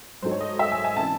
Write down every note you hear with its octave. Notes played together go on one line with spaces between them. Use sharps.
G#2 F#3 A3 D#4 C5
C#5
D#5
E5
G#5
G#5
C#3 E3 C4 A5